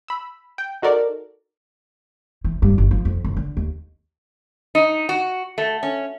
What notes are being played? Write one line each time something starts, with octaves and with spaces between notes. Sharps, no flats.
B5 E6
G5
D#4 F#4 A4 A#4 D5
E3
G2
G1
F3
F2
F#1
D3
D#2
D#4
F#4
A3
C#4